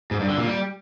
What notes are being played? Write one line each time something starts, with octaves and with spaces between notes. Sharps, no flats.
G#2
G2
D3
A#2
G3